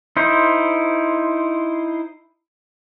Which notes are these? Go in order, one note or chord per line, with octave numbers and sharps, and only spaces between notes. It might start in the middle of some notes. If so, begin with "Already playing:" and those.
D#4 E4 C5